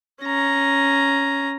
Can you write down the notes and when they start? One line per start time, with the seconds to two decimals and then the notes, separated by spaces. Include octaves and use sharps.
0.22 C#4 A#5